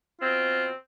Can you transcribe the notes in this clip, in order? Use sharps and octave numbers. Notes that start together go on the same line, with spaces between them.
B2 C4 F4